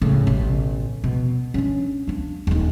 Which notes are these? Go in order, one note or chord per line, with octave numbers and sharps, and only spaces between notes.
A2 C#3
A1 B2
B2
C#4 D4
A#3 D4
D#1 D#4